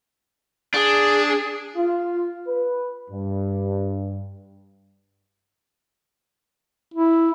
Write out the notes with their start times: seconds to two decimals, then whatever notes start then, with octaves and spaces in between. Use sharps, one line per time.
0.74 D4 G#4
1.76 F4
2.48 B4
3.11 G2
6.94 E4